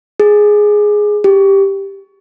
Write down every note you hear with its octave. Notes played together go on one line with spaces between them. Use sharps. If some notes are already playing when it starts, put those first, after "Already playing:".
G#4
G4